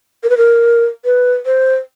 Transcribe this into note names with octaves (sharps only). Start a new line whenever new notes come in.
A#4
B4
A#4
B4
C5